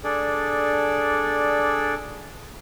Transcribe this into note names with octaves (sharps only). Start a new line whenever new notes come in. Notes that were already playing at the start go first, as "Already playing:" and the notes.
D4 G#4 A4 D5